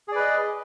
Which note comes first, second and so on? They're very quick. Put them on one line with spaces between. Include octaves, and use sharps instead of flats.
G#4 D5 B4 D#5